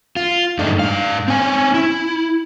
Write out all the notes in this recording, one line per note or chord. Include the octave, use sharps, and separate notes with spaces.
F4
G2 A3 D4 D#4
G#2 F5
C4 C#4 G#5
E4